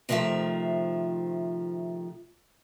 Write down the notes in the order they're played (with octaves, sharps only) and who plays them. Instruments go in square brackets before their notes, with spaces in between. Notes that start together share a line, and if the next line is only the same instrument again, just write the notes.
[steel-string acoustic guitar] C3 D#3 F3 A3 E5